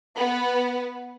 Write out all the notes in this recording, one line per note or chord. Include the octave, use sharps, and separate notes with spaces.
B3